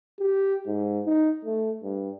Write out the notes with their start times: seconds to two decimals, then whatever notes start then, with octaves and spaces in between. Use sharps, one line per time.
0.19 G4
0.67 G#2
1.05 D#4
1.45 A3
1.83 G2